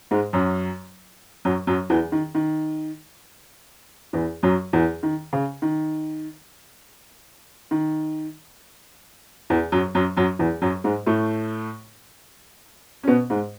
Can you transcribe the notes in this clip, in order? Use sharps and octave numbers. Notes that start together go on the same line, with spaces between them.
G#2 G#3
F#2 F#3
F#2 F#3
F#2 F#3
E2 E3
D#3
D#3
E2 E3
F#2 F#3
E2 E3
D#3
C#3
D#3
D#3
E2 E3
F#2 F#3
F#2 F#3
F#2 F#3
E2 E3
F#2 F#3
G#2 G#3
A2 A3
C#4
B2 B3
G#2 G#3